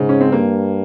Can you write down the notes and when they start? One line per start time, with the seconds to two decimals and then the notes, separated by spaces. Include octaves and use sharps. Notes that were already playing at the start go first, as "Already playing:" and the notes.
Already playing: G#2 C#3
0.09 C#4
0.21 C4
0.32 G2 A#3